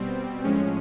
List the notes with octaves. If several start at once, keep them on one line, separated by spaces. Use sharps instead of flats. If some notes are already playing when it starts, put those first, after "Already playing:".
Already playing: B2 G3 C4
A2 F3 G#3 C#4